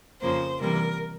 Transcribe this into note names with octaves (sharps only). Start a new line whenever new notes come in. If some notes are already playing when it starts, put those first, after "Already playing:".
F2 C#3 F3 A#3 C5
C3 E3 G3 A#3 A#4